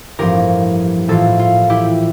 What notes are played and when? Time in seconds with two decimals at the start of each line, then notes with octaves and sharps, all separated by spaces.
0.19 A1 G2 F3 C4 G4 A#4
1.08 A#1 A2 E3 F4 A4
1.39 F4
1.70 E4 G4